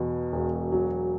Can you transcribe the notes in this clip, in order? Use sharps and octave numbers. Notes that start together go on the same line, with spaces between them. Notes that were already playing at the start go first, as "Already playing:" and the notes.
Already playing: E2 B2
E1
F#3